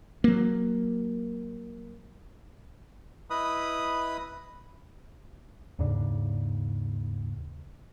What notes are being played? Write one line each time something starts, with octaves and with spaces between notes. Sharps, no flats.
F#3 A#3
E4 B4 D#5 B5 D#6
D#2 G#2 C#3 D4